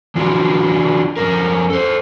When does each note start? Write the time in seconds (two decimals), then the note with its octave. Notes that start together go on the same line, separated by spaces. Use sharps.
0.15 E3 C4 D4 F4 F#4 D5
1.16 F2 B2 C#4 A#4
1.70 A4 C5